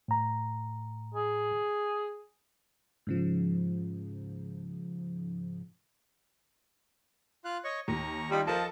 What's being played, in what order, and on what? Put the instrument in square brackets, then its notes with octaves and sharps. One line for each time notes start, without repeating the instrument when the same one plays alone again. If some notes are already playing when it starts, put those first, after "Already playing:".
[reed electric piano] A2 A#5
[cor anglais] G#4
[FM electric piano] G#2 C#3 F3
[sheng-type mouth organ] F4 F5 F#6
C#5 D#5 C#6
[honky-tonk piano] D#2 [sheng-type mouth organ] A#5 C#6
[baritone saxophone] G3 [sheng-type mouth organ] D#4 F4 B5
[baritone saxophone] F3 [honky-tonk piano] A4 A#4 [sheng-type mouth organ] D#5 A5